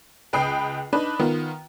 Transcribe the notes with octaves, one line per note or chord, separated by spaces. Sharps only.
C#2 B4 G5 D#6 C7
D4 D#4 B4
D#3 B3 F4